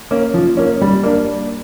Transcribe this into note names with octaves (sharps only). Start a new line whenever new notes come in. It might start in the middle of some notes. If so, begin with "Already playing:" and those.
A#3 C#4
F3
A#3 C#4
G3
A#3 D4